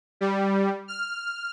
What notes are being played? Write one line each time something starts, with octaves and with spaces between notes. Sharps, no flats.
G3
F6